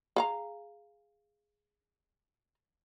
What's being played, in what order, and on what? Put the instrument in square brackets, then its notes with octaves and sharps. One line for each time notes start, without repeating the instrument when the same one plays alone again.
[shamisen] G#4 F5 A#5